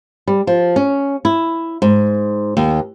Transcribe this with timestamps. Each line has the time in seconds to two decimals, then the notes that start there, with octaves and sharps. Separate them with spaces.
0.28 G3
0.47 F3
0.76 C#4
1.25 E4
1.82 G#2
2.57 D#2